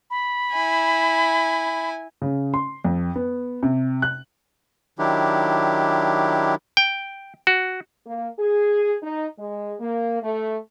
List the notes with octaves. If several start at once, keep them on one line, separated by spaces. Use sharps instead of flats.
B5
E4 G#5
C#3
C6
F2
B3
C3
F#6
D#3 F#3 D4 E4 G4
G5
F#4
A#3
G#4
D#4
G#3
A#3
A3